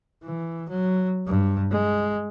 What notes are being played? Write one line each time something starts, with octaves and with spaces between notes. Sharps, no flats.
E3
F#3
G2
G#3